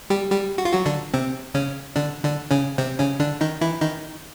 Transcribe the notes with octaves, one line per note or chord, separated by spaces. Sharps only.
G3 G4
G3 G4
F#4
F4
F#3 F#4
D3 D4
C3 C4
C#3 C#4
D3 D4
D3 D4
C#3 C#4
C3 C4
C#3 C#4
D3 D4
D#3 D#4
E3 E4
D#3 D#4